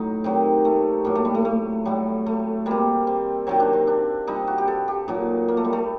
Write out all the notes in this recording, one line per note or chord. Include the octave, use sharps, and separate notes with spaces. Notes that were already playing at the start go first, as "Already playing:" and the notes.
Already playing: A2 F#3 D#4
C3 D#3 F#3 C4
A3
A2 F#3 A#3
A3
G3
A3
A3
A2 F#3 G3
A3
C3 G3 A#3
C4
C3 D#3 F#3 C4
D4
C4
D4
C3 G3 D#4
F#4
G4
A4
G4
A#2 F#3 D#4
A#3
A3
G3
A3